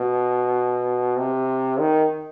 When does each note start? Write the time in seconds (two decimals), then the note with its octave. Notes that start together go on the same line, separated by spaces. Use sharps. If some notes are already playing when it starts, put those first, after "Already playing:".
Already playing: B2
1.17 C3
1.79 D#3